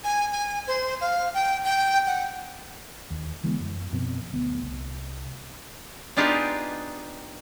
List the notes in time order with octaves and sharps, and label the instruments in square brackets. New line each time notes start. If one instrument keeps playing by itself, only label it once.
[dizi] G#5
G#5
C5
F5
G5
G5
F#5
[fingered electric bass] D#2
D3 E3 G#3 B3
F#2
F#2 B2 F3 C4
D1 A2 B3
C2
[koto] B3 D4 D#4 F4 G4 G#4